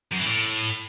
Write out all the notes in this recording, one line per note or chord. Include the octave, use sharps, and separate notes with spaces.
F#2
E3
A2